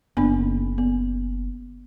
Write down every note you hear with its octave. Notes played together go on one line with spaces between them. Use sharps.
F#1 A#3 B3 D4
B3